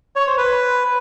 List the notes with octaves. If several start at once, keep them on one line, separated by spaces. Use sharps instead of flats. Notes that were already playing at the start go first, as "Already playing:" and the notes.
C#5
C5
B4